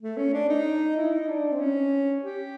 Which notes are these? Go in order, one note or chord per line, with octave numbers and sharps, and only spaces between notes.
A3
C#4
D4
D#4
E4
D#4
D4
C4
C#4
G4